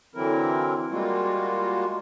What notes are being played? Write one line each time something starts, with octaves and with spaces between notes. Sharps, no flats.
D3 E3 F#3 C4 E4 A#4
G3 G#3 A#3 F4 F#4